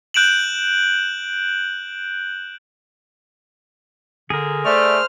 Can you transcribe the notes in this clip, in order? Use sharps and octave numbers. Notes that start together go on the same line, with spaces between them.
F#6 G6 D7 E7 F#7
D3 G#4 A#4
A3 C5 D5 F6